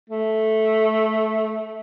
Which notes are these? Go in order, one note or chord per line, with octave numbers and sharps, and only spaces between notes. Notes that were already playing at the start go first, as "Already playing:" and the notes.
A3